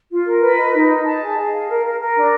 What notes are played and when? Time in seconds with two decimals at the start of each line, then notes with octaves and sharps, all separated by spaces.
0.09 F4
0.24 A#4
0.41 B4
0.56 D#5
0.73 D#4
0.88 D#5
1.05 A5
1.20 G#4
1.37 G#4
1.52 F5
1.67 A#4
1.84 A#4
2.00 A#4
2.16 D4